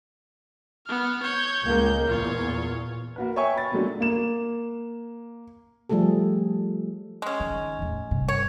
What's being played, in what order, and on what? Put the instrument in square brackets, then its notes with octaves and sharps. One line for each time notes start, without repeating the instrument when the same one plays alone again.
[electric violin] B3 F6
C#5 G6
[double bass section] C#2 G#3 A#3 [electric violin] G6
[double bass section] E2 A#2 [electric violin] F4 C#5
[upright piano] A#3 F#4 B4
C#5 E5 G5 G#5 C#6
B5 A6
A#2 F#3 G#3 A3 B3 D4
[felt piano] A#3 E7
[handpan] F3 G3 A3 G#4 A4
[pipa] G#3 C#4
[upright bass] D#3
E2 A2
G2 C3
[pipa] C#5